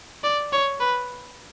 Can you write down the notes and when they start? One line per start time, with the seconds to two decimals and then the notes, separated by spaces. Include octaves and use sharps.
0.24 D5
0.52 C#5
0.80 B4